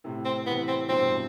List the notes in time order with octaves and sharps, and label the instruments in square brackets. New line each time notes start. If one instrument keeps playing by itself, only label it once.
[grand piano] A2 C3
[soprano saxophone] C4
[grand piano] C3 E3 [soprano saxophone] B3
[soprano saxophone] C4
[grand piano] G2 B2 [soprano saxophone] C4